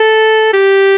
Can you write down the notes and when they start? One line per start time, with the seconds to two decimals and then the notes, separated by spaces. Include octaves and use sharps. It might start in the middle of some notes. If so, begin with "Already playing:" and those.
Already playing: A4
0.53 G4